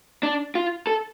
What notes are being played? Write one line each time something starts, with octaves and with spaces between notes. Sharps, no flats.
D4
F4
A4